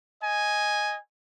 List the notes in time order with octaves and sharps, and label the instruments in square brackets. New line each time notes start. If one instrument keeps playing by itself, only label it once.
[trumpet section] D#5 G#5